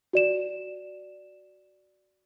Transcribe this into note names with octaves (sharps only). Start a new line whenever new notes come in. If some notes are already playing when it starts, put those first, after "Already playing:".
F#4 D5 E7